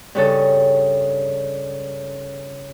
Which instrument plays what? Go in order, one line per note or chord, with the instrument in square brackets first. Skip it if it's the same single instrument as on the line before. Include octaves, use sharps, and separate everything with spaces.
[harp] G2 C#3 A4